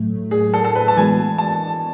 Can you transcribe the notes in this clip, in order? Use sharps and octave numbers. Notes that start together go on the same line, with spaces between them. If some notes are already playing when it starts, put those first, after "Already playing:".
Already playing: A2 F#3 A3
G#4
A4
A4
B4
A5
E3 G#3 B3 F#4 G#5
A5